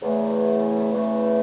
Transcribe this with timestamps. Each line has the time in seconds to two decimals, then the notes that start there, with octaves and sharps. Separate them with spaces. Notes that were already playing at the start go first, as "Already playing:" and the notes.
0.02 E2 C#3 E3 A3
0.92 E2 C#3 E3 A3